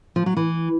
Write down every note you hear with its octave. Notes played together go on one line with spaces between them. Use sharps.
F3
F#3
E3